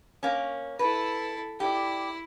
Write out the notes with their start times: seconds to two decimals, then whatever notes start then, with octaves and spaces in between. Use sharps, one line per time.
0.23 A#3 C#4
0.79 E4 A4 B4
1.60 E4 G4 D5